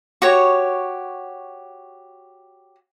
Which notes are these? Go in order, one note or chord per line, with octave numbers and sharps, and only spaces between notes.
F#4 G4 C#5